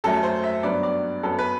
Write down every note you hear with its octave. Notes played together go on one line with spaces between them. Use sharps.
F#2 F#3 A3 A4
C5
E5
G2 F#3 B3 D5
D5
F#2 F#3 B3 A4
B4